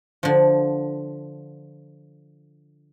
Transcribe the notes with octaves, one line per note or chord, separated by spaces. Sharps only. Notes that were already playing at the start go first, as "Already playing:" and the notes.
D3 F3